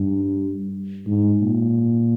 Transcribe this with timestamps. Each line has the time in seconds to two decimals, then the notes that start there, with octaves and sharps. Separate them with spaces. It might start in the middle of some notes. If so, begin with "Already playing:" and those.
Already playing: G2
1.07 G#2
1.41 A#2